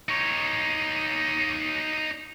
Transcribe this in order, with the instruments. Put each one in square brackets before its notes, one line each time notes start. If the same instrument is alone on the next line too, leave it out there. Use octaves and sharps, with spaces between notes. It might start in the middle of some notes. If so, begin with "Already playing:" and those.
[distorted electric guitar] D#4 C#5